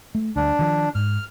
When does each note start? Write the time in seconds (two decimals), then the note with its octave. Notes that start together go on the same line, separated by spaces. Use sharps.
0.15 A3
0.36 D2 G3 D4
0.59 D#3 F3
0.95 G#2 F6